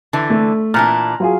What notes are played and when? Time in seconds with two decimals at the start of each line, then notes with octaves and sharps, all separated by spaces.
0.13 D3 E3
0.30 A3
0.74 A#2 E3 D4 A#5 F6
1.20 F#3 F4 G#4